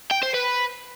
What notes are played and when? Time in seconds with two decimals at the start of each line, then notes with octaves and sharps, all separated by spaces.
0.11 G5
0.23 C5
0.34 B4